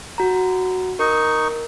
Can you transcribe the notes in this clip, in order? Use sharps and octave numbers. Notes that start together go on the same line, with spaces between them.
F#4 A#5
D#4 A#4 C#6